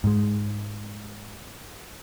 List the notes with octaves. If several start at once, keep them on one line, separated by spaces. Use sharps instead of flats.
G#2 G#3